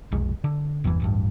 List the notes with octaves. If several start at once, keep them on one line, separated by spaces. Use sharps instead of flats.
F1 B1 G#3
D3
G1 E2 C3 E3
D1 A1 G2